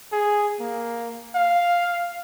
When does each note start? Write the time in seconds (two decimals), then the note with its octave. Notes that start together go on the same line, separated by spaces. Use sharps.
0.12 G#4
0.60 A#3
1.35 F5